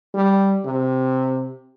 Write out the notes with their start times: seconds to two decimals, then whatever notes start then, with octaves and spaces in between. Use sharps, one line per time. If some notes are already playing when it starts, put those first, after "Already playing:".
0.14 G3
0.65 C3